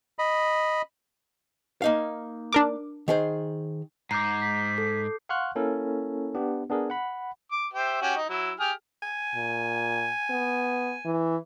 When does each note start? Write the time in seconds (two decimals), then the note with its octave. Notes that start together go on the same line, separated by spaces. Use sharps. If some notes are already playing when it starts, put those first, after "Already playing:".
0.19 D#5 B5
1.82 A#3 D#4 F5
2.53 D4 A#4 D6
3.08 D#3 G#4 C5
4.11 G#2 A#5 D6 G6 C7
4.41 B6
4.78 A4
5.29 F5 F#5 C6 C#6 F6 F#6
5.56 A#3 C#4 E4 A4 A#4
6.35 B3 D4 G4
6.70 B3 D4 G#4 A#4
6.90 F#5 B5
7.51 D6
7.73 G4 C5 E5
8.02 C#4 F#4 G4
8.16 D#4
8.29 F#3 E4
8.60 G4 G#4 F6
9.03 G#5
9.35 A#2
10.30 B3
11.05 E3